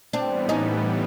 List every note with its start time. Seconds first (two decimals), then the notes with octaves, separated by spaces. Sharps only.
0.13 A2 E3 G3 B3 C4 D4
0.49 C#4 D#4